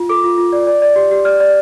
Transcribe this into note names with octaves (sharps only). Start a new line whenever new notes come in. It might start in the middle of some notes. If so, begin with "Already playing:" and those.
Already playing: F4
A4 D6
F4
F4
D5
D5
D5
G4
G4
D5 F6
D5